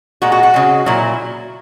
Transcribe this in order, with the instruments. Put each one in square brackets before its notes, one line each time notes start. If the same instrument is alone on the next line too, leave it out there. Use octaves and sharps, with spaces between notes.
[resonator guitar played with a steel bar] A#2 G#3 F#4
F#4
F#4
C#3 G#3
A#2 F#3 E4